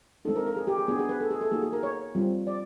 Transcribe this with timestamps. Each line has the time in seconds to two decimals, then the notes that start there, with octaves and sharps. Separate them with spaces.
0.25 G#3 C4 D#4 A4
0.36 A#4
0.46 A#4
0.56 G#4
0.67 G4
0.78 G#4
0.88 B3 D4 F#4 G#4
0.99 G#4
1.09 B4
1.20 A4
1.31 G#4
1.41 A4
1.51 A#3 D#4 F#4 G#4
1.62 G#4
1.73 A#4
1.83 C#5
2.15 G3 C4 F4
2.47 D5